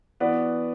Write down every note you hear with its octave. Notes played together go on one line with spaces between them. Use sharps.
E3 B3 F#4 B4 D5